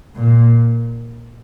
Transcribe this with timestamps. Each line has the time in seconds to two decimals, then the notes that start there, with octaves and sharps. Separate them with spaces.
0.16 A#2